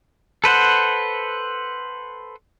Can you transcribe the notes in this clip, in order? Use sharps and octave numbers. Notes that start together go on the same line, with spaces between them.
A4 B4 C5 F#5